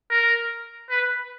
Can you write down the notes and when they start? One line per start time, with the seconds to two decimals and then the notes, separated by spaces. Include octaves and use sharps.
0.11 A#4
0.90 B4